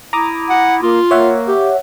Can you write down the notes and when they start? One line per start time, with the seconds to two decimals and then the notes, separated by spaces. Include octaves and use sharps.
0.13 E4 A#5 D6 D#6
0.50 F#5
0.83 A#3 F4
1.11 A#3 C#5 E5 F#5
1.48 G4